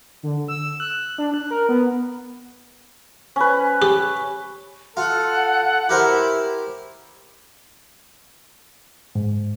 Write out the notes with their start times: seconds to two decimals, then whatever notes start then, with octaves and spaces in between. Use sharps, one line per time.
0.23 D3
0.48 E6
0.80 F#6
1.18 D4
1.34 F#6
1.51 A#4
1.69 B3
3.36 C#4 B4
3.82 G4
4.97 F4 A4 F#5
5.89 E4 G4 A#4 C5
9.15 G#2